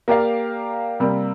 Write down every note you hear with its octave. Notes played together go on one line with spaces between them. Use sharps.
A#3 G4 A#4 D5 F5
C3 G3 A#3